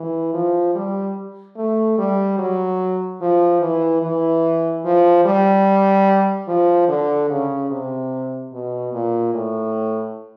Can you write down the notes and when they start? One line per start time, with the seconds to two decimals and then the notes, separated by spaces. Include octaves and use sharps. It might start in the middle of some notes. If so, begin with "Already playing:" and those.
Already playing: E3
0.34 F3
0.75 G3
1.57 A3
1.98 G3
2.38 F#3
3.21 F3
3.61 E3
4.02 E3
4.84 F3
5.25 G3
6.47 F3
6.88 D3
7.29 C#3
7.70 C3
8.52 B2
8.93 A#2
9.34 A2